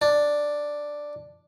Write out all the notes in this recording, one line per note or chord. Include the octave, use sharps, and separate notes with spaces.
D4